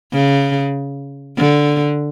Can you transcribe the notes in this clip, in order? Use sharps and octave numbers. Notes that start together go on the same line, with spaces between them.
C#3
D3